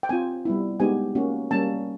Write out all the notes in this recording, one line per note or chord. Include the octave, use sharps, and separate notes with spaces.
G5
C4 F4 G#5
G3 B3 E4
G#3 B3 D#4 G4 G#5
A#3 C#4 F#4
G3 A#3 C#4 F#4 A5